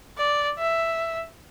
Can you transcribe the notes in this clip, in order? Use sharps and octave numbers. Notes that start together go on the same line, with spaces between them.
D5
E5